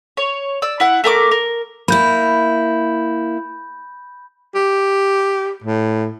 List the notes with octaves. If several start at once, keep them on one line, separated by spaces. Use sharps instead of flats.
C#5
D5 E6
E4 F#5
A3 A#4 G5 D6
A#4
A#3 E4 B5 G6
G4
A2